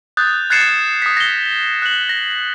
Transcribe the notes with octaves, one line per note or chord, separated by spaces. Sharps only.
D#6 F#6 G6 A6
F#6 G#6 A6 C7 C#7 E7
D#6 B6
A#6 G7
F#6 F#7
A#6